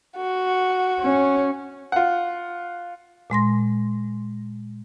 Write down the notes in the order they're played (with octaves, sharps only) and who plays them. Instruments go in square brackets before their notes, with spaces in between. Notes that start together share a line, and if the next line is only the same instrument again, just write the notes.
[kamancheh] F#4
[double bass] C#4
[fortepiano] F4 F#5
[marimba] A#2 G#3 C6 A#6